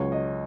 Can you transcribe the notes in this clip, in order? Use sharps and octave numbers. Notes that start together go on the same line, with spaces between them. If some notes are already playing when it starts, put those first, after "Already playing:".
Already playing: C#2 C#3 F#3 C#5
D#5